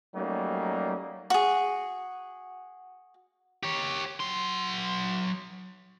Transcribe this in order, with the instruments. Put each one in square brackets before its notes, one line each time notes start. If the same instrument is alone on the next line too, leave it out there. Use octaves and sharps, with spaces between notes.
[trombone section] F#3 G3 A3 A#3 C#4 D#4
[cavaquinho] F#4 G#4
[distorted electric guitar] G4 C#5
F#3 C6